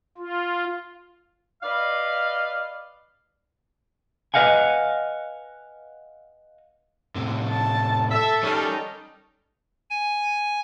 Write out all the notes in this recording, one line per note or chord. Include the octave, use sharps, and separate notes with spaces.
F4
B4 D5 D#5 F5
B4 D#5 F5 F#5 G#5
A2 C3
A5
A4 E5
D#3 G3 C#4 D#4
G#5